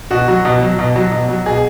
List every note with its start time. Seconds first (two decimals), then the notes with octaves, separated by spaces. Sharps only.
0.11 B2 F#4
0.28 F#3
0.45 B2
0.61 F#3
0.79 B2
0.96 F#3
1.11 B2
1.29 F#3
1.46 B2 G#4